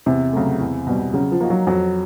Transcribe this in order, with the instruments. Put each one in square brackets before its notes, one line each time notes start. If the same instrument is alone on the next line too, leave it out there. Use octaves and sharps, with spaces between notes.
[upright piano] E2 [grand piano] C3
[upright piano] C#3 F#3 A3
E2
B2 G3
[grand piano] C#3 [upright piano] F#3
[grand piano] F3
[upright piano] A#3 D#4 F#4
[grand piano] F#3
[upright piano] F2 [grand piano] F#3